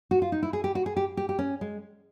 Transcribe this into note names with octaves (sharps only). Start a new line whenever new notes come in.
F#4
F4
D#4
E4
G#4
G4
F#4
G#4
G4
G4
G4
C#4
G#3